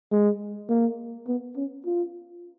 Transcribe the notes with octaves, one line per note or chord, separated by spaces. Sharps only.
G#3
A#3
B3
C#4
F4